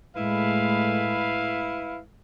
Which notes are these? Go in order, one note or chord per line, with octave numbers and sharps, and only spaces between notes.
A2 G#3 A3 E4 B4 F5